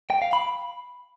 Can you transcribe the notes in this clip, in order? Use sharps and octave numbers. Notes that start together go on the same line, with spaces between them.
G5
F5
B5